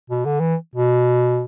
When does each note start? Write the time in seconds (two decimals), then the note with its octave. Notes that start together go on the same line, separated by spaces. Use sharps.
0.10 B2
0.25 D3
0.40 E3
0.76 B2